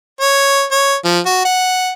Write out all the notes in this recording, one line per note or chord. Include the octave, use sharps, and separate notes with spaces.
C#5
C#5
F3
F#4
F#5